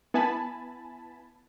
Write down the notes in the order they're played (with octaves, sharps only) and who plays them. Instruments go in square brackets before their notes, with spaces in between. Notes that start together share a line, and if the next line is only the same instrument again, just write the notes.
[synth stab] B3 E4 G#5 A5 B5